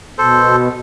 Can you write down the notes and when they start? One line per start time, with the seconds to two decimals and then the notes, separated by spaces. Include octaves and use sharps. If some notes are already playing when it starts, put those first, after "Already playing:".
0.18 B2 A4 C5